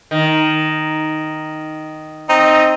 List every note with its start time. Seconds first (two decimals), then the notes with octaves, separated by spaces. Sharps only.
0.11 D#3
2.29 C4 D#4 D#5